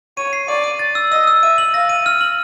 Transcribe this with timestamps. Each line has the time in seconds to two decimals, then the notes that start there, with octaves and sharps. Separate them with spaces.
0.17 C#5 D#7
0.33 C7
0.48 D5 D#7
0.64 D#7
0.79 A6
0.95 E6
1.11 D#5 E6
1.27 E6
1.43 E5 D#7
1.58 F#7
1.74 F5 A#6
1.89 D#7
2.06 F6
2.21 F#7